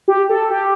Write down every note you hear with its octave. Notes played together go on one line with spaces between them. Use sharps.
G4
A4
G4